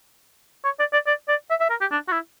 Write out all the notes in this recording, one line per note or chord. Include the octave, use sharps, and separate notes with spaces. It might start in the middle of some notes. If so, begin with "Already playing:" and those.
C#5
D5
D5
D5
D5
E5
E5
A#4
G4
D4
F#4
E4